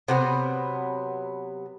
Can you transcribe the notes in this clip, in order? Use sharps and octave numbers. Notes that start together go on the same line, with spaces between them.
C3 F#3 B3